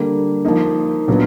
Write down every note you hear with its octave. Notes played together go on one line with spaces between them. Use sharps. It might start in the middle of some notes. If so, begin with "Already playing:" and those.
Already playing: D3 G3 A#3
F3 A#3 D#4
A#2 F#3 B3 D4